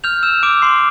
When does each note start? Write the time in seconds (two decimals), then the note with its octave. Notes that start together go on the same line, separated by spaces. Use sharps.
0.04 F6 G6 F7
0.23 E6 G6 E7
0.43 D6 E6 D7
0.62 C6 C7